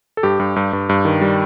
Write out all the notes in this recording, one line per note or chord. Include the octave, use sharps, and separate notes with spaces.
A4
G2 G4
G2
G2
G2
G2
D#3
G3